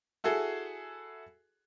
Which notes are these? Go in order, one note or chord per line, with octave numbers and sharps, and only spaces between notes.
E4 F#4 G#4 A4